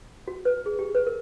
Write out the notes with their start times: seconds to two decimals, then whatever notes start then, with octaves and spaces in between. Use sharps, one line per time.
0.28 F#4
0.45 B4
0.66 G#4
0.79 G4
0.95 B4
1.07 A#4